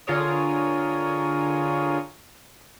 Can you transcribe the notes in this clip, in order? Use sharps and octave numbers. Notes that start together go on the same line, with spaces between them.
D3 F4 G#4 A#4 C#5 D#6